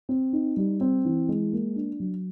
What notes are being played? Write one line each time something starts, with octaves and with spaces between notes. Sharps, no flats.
C4
D#4
G3
C4
E3
G#3
A#3
D4
F#3